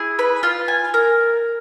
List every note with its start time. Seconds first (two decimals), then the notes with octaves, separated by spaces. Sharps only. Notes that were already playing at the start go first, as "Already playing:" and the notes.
Already playing: E4 G#4
0.19 B4
0.43 F4
0.68 G#5
0.94 A#4